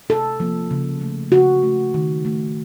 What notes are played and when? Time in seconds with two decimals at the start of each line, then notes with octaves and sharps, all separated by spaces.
0.09 C3 A4
0.40 F3 A#3
0.71 C#3
1.01 A3
1.32 C#3 F#4
1.63 A3
1.94 D#3
2.25 A3